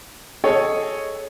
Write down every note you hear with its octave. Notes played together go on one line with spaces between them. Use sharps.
G#4 A4 C#5 D#5